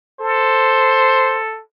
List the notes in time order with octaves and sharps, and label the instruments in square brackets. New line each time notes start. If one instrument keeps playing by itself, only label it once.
[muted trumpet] A4 [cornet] C5